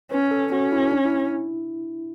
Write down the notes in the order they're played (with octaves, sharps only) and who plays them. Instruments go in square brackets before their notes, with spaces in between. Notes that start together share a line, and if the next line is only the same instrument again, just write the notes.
[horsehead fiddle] C#4 [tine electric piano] B4
[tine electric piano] A4
[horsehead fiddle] C#4 [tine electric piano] F#4
[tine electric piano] E4
D4
E4